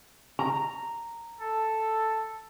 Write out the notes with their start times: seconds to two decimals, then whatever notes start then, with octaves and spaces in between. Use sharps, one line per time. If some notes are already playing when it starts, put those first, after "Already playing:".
0.39 A#5
1.40 A4